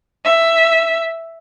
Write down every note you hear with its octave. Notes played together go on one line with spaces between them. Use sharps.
E5